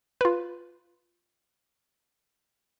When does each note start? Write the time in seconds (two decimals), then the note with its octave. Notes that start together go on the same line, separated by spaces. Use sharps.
0.21 F4 B4